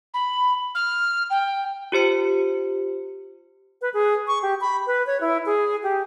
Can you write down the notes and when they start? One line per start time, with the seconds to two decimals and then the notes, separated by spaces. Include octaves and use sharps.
0.14 B5
0.75 F6
1.30 G5
1.92 F4 G4 C5 C#7
3.81 B4
3.94 G#4
4.27 C#6
4.42 G4
4.61 B5
4.87 B4
5.07 C#5
5.21 E4
5.46 G#4
5.83 G4